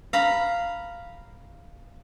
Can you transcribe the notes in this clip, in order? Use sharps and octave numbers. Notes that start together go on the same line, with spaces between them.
F5 A#5 B5